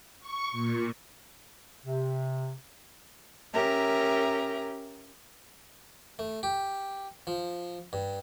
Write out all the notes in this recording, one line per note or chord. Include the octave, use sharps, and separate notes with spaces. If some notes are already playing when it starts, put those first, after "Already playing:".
C#6
A#2
C3
C#4 G4 A#4 E5 A#5
A3
G4
F3
G2